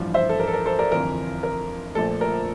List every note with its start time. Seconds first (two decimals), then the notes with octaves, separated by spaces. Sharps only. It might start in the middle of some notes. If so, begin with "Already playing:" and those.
Already playing: A1 G2 F3
0.14 C5 E5
0.29 A4
0.40 A#4
0.48 A4
0.53 A#4
0.66 A4 C5
0.79 A#4 D5
0.92 G1 F2 E3 A#4
1.43 A#4
1.95 A#1 A#2 A3 A4
2.21 A#4